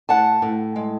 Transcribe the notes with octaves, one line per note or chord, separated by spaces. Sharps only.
A2 F#5 A5
A2
G#3